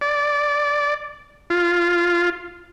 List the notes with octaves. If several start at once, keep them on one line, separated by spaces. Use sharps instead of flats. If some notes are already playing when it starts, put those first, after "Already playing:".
D5
F4